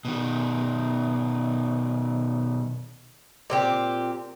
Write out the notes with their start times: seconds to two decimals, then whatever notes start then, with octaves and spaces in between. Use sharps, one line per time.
0.05 B2 D#3
3.50 A#2 C4 G4